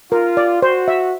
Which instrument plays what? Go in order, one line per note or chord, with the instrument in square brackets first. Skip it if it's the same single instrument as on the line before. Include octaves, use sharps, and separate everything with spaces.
[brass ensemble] F4 [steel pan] A#4
[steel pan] D5
[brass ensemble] F#4 [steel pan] C5
[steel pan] E5